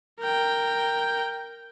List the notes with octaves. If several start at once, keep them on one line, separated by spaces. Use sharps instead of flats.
A#4 G5